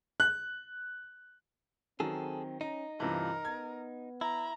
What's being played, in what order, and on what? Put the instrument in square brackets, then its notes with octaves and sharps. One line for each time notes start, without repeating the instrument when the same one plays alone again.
[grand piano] F#6
[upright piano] D#3 F#3 [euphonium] C4 [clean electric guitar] G#4 A4
[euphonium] C#4 [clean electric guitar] D#4 [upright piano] A#5
[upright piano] G2 C3 E3 [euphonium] F4 [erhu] A#4
[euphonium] B3 [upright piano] G#6
[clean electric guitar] E4 [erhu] A#5